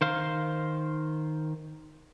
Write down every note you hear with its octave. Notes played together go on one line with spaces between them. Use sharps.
D#3 C5 F5